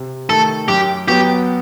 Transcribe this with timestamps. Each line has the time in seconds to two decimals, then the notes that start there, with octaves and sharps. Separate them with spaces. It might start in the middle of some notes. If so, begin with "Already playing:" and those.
Already playing: C3
0.30 D#3 A3 A4
0.68 F#2 G4
1.08 F#3 B3 F#4 G4